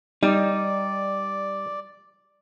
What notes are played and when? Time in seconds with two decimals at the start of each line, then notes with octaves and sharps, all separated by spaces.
0.23 G3 D#4 D5